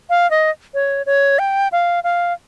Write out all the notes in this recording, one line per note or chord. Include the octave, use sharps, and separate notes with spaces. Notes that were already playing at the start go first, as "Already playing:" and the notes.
F5
D#5
C#5
C#5
G5
F5
F5